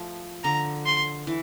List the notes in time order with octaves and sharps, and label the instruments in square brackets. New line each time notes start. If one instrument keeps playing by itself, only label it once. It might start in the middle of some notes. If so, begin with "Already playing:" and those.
Already playing: [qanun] F3 A3
[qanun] D3 [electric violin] A#5
[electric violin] C6
[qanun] E3